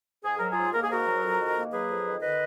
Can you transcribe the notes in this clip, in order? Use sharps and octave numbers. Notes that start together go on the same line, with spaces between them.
G#2 G#4
F#3 A#4
G#2 F4 G#4
A#3 A#4
G#4
G#2 F#4 A#4
F#3
F2
D#3
A#3
F#3 G#4 B4
F2
D#3
D3 B4 D#5